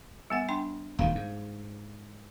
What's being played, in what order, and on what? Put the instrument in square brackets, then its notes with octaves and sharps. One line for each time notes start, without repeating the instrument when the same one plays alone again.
[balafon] G3 B3 F#5
D4 G5 C6
[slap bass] D#1 D2 D#3 [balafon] F5
[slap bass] G#2